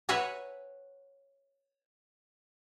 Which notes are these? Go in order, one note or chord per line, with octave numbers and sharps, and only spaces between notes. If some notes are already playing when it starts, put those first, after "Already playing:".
B4 C#5 E5 F#5 G#5 A#5